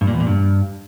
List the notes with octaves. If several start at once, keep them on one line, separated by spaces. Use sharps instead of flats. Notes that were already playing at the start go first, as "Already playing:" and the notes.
G2
A#2
E2
A#2
G2